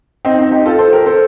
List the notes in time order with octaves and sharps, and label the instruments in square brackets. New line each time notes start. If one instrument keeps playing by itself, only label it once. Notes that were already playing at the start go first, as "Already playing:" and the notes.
[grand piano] C4 D#4
C4 D#4
D#4 G4
F4 A4
A4 C5
G4 A#4
A4 C5